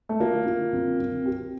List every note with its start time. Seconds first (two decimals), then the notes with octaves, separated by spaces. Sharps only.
0.09 A3
0.20 A#3 F4
0.46 F4
0.73 C4
1.00 C4
1.26 G4